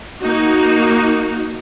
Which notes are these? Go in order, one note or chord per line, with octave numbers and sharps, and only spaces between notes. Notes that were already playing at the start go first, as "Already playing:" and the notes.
A#3 D#4 F#4